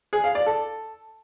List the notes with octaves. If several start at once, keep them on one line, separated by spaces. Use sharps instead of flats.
G#4
F5
D5
A4